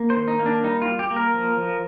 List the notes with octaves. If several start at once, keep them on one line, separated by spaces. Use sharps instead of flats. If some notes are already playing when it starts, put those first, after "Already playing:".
Already playing: A#3
C5
D#3
D#4
A#3
D4
G3 D#4
F4
G3
G4
A#3
A#4
F3
F3